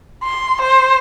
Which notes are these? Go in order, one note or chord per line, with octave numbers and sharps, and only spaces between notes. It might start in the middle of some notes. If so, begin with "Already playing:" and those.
C6
C5